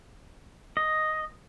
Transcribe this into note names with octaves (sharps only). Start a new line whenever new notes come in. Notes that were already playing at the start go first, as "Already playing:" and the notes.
D#5